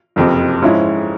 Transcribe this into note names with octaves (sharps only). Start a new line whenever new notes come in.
F#1 F2 C3
G#2 F3 G#3 C#4 E4